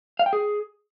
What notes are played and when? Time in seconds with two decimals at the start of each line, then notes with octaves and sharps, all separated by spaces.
0.19 F5
0.26 G5
0.33 G#4